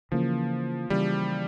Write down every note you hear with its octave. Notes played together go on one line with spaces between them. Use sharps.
C#3 E3 F3 A#3
C#3 E3 G3 A#3